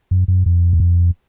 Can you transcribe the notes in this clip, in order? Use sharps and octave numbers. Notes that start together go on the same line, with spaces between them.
F#2
F#2
F2
E2
F2